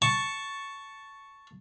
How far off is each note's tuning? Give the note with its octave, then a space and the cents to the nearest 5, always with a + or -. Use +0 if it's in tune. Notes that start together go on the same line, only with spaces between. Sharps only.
A5 +0 C#6 +0